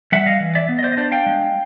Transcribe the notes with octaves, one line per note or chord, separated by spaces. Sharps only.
G3 E5 F#5
D#5 F5
E3
D5 E5
B3
D#5
C5 D5
D#5
D4 C5 D5
F5 G5
G#3